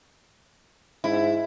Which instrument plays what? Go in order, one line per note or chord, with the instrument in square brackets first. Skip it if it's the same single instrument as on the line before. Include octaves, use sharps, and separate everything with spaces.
[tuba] G#2 [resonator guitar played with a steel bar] E4